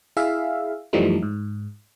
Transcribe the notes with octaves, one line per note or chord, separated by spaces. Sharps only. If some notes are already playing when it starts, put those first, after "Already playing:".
E4 G#4 E5 F5
F#2 E3 F3 G3 A3 D#4
G#2